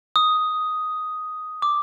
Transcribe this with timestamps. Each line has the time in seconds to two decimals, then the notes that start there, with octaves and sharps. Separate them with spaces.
0.16 D#6
1.62 D6